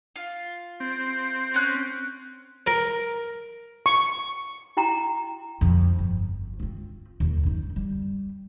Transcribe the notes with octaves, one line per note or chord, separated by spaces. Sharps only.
F4
C4
C#4 F#6
A#4
C#6
E4 F#4 G5 A#5
F2 F3
G1
C4 F4
D#2
F#2 D#4
G3